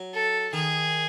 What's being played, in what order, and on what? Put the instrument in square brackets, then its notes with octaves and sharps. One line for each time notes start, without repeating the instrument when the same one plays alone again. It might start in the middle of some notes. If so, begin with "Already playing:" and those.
Already playing: [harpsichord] F#3
[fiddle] A4
[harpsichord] D#3 [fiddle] G#4